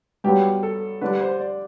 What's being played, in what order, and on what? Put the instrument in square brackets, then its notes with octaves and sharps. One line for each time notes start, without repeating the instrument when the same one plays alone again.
[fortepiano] G2 F#3 B3 [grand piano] G4
[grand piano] A4
[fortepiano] D3 G3 D4 [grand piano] B4
[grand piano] C5
D5